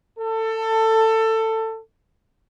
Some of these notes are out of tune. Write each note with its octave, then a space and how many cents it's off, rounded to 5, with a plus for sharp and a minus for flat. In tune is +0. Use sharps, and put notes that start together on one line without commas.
A4 +20